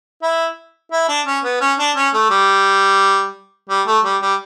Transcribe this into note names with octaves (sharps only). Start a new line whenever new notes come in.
E4
E4
D4
C#4
B3
C#4
D4
C#4
A3
G3
G3
A3
G3
G3